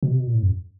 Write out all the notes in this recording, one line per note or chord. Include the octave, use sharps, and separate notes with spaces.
B2
C3
B2
A#2
A2
F#2